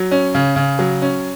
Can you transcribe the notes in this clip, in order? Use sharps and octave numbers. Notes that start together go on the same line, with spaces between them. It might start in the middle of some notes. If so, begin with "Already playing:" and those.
Already playing: F#3
C#4
C#3
C#3
F#3
C#4